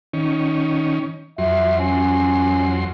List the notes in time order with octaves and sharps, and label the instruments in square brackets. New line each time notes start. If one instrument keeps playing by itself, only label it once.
[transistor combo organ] D#3 C#4
[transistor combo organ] F2 F#3 C6 [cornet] E5
[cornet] C#4